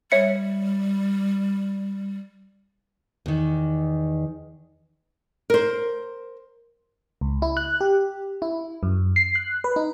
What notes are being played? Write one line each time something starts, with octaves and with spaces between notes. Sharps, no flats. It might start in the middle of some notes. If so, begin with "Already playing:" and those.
G3 C#5 E5 C#7
E2 D#3
A#4 C5
C#2
E4
F#6
G4
E4
F#2
C7
F#6
B4
D#4